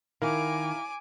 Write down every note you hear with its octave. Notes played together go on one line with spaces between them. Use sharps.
D#3 E4 A#4 F5 G#5 D6